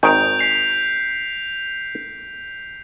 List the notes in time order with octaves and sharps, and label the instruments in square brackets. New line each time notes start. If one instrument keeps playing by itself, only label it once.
[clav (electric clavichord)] G#1 D#3 G#5 [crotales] G6 D7 F7
[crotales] B6 C7 F7